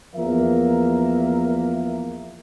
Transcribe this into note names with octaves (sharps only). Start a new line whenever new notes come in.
E2 F3 A#3 A#4 E5